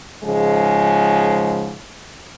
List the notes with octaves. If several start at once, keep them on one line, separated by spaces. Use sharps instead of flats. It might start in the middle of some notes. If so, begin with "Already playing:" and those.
G#2 C#3 F3 G#3